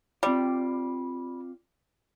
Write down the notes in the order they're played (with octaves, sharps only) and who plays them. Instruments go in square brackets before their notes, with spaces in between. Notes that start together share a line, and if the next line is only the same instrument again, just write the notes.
[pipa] G3 [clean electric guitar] C4 F4 D5